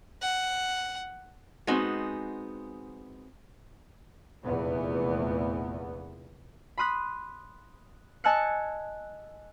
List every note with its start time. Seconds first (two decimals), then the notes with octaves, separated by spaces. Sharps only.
0.22 F#5
1.67 G#3 B3 C4 D#4 F#4
4.43 F1 E2 A#2 B3
6.78 B5 C6 D#6 F#6 B6
8.24 D#5 G#5 A5 E6 F#6 C#7